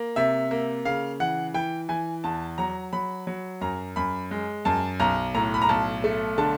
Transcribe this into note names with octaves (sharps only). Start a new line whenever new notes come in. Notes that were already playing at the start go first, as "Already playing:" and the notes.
Already playing: A#3
C3 E5
A#3
C#3 F5
E3 F#5
E3 G5
E3 G#5
E2 A5
F#3 A#5
F#3 B5
F#3
F#2 A#5
F#2 B5
G#3
F#2 A5
B1 A#5
A2 A#5
B5
A#5
B1 A5
A3
D3 A5